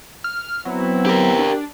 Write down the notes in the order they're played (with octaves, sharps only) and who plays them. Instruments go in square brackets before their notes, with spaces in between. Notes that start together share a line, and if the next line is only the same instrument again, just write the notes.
[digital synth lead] F6
[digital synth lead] F#3 [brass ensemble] B3 C4 E4
[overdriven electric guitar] G4 A#4
[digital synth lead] D4